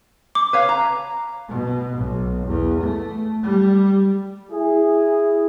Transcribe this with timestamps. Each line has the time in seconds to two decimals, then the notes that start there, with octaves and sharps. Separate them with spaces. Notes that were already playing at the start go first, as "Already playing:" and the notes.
0.35 D6
0.53 B4 C#5 F5
0.69 A#5
1.48 B2
1.97 B1
2.47 E2
2.80 A3
3.43 G3
4.51 E4 G#4